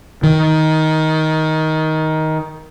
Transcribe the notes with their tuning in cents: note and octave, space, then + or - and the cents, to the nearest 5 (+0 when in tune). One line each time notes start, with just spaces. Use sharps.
D#3 +15